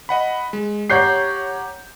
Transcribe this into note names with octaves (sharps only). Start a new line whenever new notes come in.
D#5 F#5 B5
G#3
G4 C#5 F#5 A#5 G6 C7